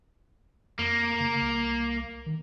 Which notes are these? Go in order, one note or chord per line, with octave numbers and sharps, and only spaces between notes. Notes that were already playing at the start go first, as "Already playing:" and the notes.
F2 A#3
C#3
C2
D#3